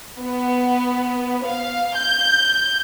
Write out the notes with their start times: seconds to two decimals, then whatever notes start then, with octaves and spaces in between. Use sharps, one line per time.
0.19 B3
1.46 F5
1.95 G6